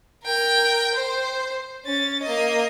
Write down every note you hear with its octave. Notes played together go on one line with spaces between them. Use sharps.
A#4 G5
C5
C#4 A6
A#3 D#5